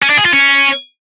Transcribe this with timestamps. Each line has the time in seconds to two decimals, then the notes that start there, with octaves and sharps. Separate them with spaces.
0.02 C#4
0.10 D4
0.18 G#4
0.25 F4
0.33 C#4